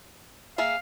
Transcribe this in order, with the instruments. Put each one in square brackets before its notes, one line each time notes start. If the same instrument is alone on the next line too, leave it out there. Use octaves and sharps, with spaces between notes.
[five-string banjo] A#3 G#4 E5 [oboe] F5